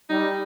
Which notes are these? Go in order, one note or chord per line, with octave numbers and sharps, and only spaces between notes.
G3 D#4